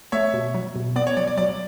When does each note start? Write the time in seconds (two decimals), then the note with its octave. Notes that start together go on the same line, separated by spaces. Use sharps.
0.12 A3 C#5 E5
0.34 B2
0.54 F#3
0.75 B2
0.96 B3 D5
1.07 C#5
1.17 F#3 D5
1.27 D5
1.38 F#3 D5